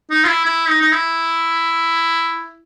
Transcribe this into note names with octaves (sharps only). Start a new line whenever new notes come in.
D#4
F4
E4
E4
D#4
D#4
E4